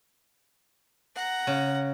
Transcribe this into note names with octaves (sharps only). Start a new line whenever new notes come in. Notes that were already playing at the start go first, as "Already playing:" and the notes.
F#5 A#5
C#3